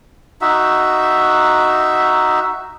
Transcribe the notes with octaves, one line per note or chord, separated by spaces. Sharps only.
D#4 F#4 E5